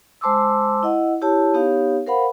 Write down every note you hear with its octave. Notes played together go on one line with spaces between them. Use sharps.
G#3 C5 A5 C6 D6 E6
E4 D#5 F#5
E4 G4 C#5 A5
B3 D#4 G4 C#5 F5
A#4 C5 F5 F#5 B5